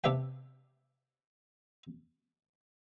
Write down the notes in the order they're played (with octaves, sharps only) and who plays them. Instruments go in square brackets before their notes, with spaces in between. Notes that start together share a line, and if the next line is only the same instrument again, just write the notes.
[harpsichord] C3 D4 G4 B4 E5 G5